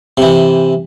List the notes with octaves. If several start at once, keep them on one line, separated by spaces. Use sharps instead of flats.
C3 E3